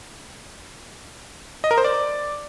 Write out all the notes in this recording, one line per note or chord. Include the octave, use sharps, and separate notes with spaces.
D#5
A#4
C5
D5